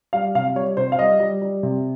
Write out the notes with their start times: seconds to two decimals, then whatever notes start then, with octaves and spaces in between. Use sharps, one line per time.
0.13 G3 F5
0.35 C3 F5
0.55 G3 C#5
0.77 C3 C5
0.92 F5
0.99 G3 D#5
1.20 G3
1.42 G3
1.63 C3